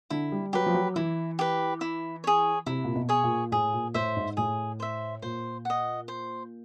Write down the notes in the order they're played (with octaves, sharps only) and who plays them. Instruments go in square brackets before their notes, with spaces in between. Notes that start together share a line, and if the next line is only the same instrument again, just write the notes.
[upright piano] D3 [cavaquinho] E4
[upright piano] G3
[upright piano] F#3 [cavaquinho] G4 B4
[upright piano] F3
F#3
[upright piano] E3 [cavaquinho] E4
[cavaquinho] G4 B4
E4
G#4 C#5
[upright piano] C3 [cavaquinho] E4
[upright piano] A#2
B2
[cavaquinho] G#4 C#5
[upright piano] A#2
[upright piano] A2 [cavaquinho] G#4
[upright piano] A#2
[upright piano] A2 [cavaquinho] C5 E5
[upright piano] G#2
[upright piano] A2 [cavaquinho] G#4
[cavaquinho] C5 E5
[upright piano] A#2 [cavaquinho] C5
[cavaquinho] D#5 F#5
C5